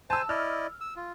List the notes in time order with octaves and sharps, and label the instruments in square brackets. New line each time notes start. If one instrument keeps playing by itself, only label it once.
[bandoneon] C5 G#5 [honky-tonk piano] A5 E6
[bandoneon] E4 D5 D#5 [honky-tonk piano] F6
[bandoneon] E6
F4